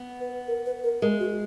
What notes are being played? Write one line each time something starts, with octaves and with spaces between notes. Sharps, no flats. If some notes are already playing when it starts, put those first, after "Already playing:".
Already playing: B3
B4
A#4
B4
A#4
G#3 A#4
F#4